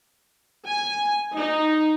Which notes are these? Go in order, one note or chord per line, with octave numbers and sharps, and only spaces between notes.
G#5
D#4